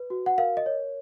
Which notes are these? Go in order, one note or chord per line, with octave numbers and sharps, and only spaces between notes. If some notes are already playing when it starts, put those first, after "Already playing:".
Already playing: B4
F#4
F#5
A#4 F5
D#5
C#5